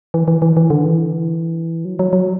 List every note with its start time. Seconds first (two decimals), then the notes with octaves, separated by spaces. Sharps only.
0.14 E3
0.28 E3
0.42 E3
0.57 E3
0.70 D3
0.84 E3
1.85 F#3
1.99 F#3
2.13 F#3